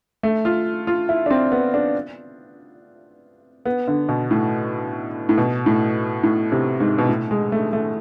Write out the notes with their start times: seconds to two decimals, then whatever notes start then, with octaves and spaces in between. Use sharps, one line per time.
0.23 A3
0.45 F4
0.87 F4
1.09 E4
1.26 D4
1.31 C4
1.52 B3
1.74 D4
3.66 B3
3.88 D3
4.09 B2
4.31 A2
5.29 A2
5.38 B2
5.66 A2
6.23 A2
6.52 C3
6.80 G#2
6.98 B2
7.09 A2
7.31 G#3
7.52 A3
7.73 A3